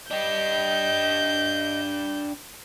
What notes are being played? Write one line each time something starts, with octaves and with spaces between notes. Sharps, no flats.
D4 G4 D#5 G6